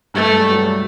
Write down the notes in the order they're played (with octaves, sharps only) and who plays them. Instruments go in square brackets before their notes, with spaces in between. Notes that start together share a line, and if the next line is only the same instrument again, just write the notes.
[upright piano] G2 G3 [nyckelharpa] A3
[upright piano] G#3
G3
F#3
G3